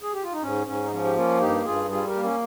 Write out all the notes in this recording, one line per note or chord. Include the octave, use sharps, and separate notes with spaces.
G#4
G4
F4
D#4
G#2 C#4
G#2 C#4
D#4
F3 C#4
G4
A#3 C#4 F4
G2 D#4 G4
G2 F4 G#4
G3 F4 G#4
G4 A#4
A#3
C#4